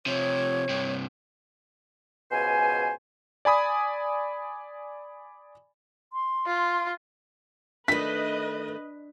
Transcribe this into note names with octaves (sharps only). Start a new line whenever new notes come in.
C3 F3 C#5
G2 C3
C#2 B2 C5 G#5
D5 G#5 B5 D#6
C6
F4
D#3 A3 D4 B4 D#5 B6